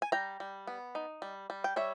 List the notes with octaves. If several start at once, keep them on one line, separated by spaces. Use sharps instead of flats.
G#5
G3 G5 A#5
G3
B3
D#4
G3
G3
G5
G3 C#5 E5